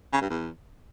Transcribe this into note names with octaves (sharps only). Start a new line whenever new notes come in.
C#3
G2
E2